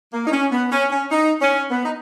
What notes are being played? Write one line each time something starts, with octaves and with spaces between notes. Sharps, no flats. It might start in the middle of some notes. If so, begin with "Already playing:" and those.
A#3
D#4
C#4
B3
C#4
C#4
D#4
C#4
B3
D#4